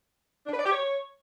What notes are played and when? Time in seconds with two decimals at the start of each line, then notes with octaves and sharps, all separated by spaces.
0.47 D4
0.53 B4
0.59 D5
0.65 G4
0.72 C#5